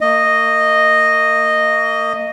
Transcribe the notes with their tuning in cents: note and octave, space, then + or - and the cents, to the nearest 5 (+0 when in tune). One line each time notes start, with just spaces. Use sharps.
A#3 -35 D#5 -5